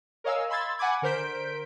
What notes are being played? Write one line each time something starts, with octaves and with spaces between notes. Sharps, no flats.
A#4 C#5 D#5 F5 G#5 E6
B5 C6 E6 G#6 A6
F#5 G#5 B5 D6 G#6
D3 A#4 C5 G6 B6 D7